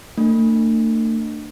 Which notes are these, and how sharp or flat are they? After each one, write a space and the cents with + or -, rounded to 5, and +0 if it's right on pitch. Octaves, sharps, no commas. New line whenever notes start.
A3 +40 D4 +20